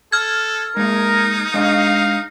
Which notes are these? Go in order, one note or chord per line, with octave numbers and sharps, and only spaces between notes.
A4 F6 G#6
G#3 A#3 D#4 A#4
G#3 D4 D#5 F5